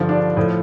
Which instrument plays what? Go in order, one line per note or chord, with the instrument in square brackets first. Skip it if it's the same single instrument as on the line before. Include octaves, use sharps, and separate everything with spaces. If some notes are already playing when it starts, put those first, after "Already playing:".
Already playing: [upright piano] G2 D3 F3
D4 D5
A2 F3